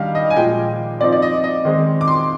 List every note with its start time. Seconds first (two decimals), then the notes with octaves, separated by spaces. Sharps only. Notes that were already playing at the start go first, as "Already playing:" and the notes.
Already playing: D#3 G3 D4 F5
0.15 D#5
0.30 G#5
0.37 A#2 F3 G#3 G5
1.01 F3 C4 D#4 D5
1.12 D5
1.22 D#5
1.44 D#5
1.65 D#3 G#3 C4 D#4
2.01 D6
2.08 C6